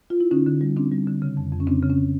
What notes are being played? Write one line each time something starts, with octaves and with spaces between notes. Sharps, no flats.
F4
E4
D3 C#4 D#4
D3
G3
D3 C4 D4
G3
D3
C#3
F2
F2
C#4
C#3 C4 D4
C#3
C#4